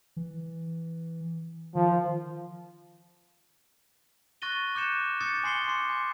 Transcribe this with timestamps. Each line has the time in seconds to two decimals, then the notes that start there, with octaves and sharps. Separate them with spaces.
0.17 E3
1.75 D#3 F3
4.42 C#6 F#6 A6 A#6 D#7 G7
4.75 D6 F#6 G6 C#7 E7
5.21 D6 D#6 G6 A6 C#7
5.44 G#5 C6 C7 C#7 G7
5.67 G#5 C6 D6 C#7
5.89 G#5